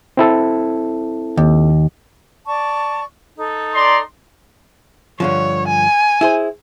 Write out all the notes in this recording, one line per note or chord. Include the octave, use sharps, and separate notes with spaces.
C4 E4 A4
D#2
D5 A5 C#6
D#4 A4
D5 A#5 C6
G2 D3 F3 C#5
G#5
E4 G#4 C5